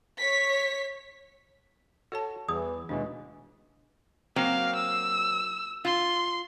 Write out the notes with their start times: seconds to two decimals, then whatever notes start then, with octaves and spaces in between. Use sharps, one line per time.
0.19 C#5 B6
2.12 F#4 A4 C#5 A5
2.49 E2 E3 G#4 D#6
2.89 D#2 B2 E3 G#3 D4
4.36 F#3 A#3 C4 F5
4.76 E6
5.85 F4 C6